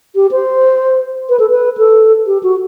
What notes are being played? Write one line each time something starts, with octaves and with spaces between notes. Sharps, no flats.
G4
C5
B4
A4
B4
A4
G4
F#4